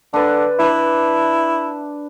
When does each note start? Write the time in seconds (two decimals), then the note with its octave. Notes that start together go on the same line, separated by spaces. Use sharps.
0.14 D3 D4 B4
0.59 D4 E4 B4